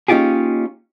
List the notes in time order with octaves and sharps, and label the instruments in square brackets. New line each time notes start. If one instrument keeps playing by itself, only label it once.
[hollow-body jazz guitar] A#3 C#4 D#4 F4 G4 G#4